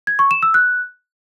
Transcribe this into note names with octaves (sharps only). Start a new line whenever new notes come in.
G#6
C#6
E7
E6
F#6